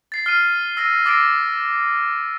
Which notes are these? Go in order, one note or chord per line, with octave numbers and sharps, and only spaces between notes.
A6 C7
F6 C7 D#7
E6 A#6 D#7
D6 E6 A6 A#6 C7 D7